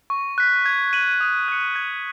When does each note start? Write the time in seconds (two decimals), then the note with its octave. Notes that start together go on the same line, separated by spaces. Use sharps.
0.10 C#6
0.38 F#6 B6
0.66 G#6
0.93 D#7 F#7
1.21 D#6
1.48 F#6 C#7
1.75 G#6